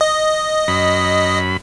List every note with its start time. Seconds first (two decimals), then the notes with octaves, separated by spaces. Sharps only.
0.01 D#5
0.68 F#2 B5